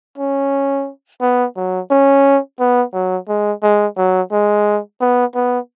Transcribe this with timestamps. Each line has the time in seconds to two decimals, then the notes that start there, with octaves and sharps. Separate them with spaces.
0.18 C#4
1.22 B3
1.56 F#3
1.91 C#4
2.60 B3
2.93 F#3
3.28 G#3
3.63 G#3
3.97 F#3
4.32 G#3
5.01 B3
5.35 B3